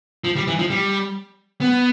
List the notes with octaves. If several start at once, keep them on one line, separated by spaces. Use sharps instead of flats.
F3
G3
E3
F3
G3
B3